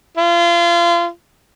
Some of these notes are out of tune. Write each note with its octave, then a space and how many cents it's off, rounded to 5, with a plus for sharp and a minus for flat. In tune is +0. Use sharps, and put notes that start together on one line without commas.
F4 -30